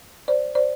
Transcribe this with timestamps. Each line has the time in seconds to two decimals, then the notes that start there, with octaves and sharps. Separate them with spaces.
0.28 C5 D5
0.55 C5 D5